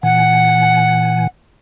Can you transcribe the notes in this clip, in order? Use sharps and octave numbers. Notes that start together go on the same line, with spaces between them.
A#2 E3 F#5 G#5